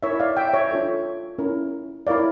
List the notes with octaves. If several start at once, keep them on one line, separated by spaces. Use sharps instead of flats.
E4 A#4 C#5 E5
D5 F5
E5 G5
C#5 E5
D4 F4 A4 C#5
C#4 E4 A#4
E4 A#4 C#5 D5 F5